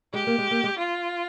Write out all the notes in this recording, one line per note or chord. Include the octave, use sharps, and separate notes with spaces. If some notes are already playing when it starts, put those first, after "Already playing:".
G#3 G4
A#3
G#3
A#3
G#3
F4